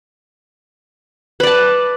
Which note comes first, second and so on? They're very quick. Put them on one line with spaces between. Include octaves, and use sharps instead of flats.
B4 D5 A5